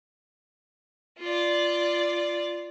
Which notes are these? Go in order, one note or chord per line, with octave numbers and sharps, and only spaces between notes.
F4 D5